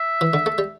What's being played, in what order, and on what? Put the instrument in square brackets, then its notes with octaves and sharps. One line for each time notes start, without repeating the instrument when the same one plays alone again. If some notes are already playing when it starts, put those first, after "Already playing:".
Already playing: [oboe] E5
[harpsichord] E3
D3
A3
G3